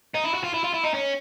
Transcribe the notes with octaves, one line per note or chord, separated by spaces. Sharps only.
D#4
E4
F#4
F4
E4
F4
E4
D#4
C#4